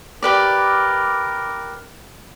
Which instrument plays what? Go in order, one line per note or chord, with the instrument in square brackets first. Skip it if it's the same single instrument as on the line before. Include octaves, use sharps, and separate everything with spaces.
[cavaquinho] G4 B4 D5 [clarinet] A#4